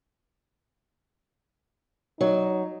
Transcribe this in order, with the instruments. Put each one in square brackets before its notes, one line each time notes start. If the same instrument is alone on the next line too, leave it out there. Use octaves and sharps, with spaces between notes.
[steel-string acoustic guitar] F#3 [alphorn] D#4